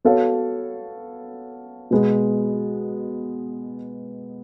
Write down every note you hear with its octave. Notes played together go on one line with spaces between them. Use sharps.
B3 F#4 A4 C#5 F5
B2 G#3 B3